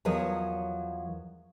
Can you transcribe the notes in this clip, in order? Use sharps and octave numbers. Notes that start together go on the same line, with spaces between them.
E2 F3 F#3 A#4 C#5 D#5